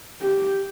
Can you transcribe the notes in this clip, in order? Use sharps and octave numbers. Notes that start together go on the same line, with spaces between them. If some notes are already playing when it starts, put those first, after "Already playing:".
G4